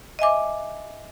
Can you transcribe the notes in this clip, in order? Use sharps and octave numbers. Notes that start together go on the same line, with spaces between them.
D#5 E5 G#5 D6